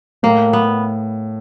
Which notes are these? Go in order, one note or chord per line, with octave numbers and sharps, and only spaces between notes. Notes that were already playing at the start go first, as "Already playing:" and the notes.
A2 A#3
B3